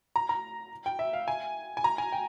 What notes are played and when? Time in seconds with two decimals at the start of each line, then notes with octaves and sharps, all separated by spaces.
0.16 A#5
0.29 A#5
0.86 G5
0.99 E5
1.13 F5
1.28 G#5
1.77 G#5
1.84 A#5
1.98 G#5
2.12 G5